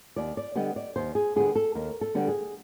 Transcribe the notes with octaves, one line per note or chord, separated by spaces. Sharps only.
D#2 D5
D5
D3 G3 B3 D#5
D5
D#2 C5
G#4
D3 G3 B3 G#4
A4
D#2 A#4
A4
D3 G3 B3
G#4